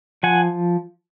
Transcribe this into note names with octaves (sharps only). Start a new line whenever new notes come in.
F3 F#5 G#5